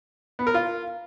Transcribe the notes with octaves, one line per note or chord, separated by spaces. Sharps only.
B3
A#4
F4